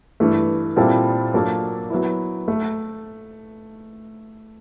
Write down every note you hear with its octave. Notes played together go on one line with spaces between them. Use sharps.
G2 E3 A3
A#2 G3 C4 E4 A4
F#3 A#3 D4 F4 A4
F#3 B3 E4
A3